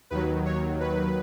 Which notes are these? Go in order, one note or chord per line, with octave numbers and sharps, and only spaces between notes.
D#2 D#3 F#3 B4
C#5
B4